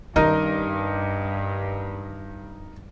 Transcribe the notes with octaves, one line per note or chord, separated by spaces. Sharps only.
G2 D#3 C#4 D#4 A#4 D#5